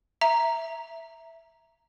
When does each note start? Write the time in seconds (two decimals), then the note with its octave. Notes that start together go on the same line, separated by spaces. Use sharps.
0.21 E5 A#5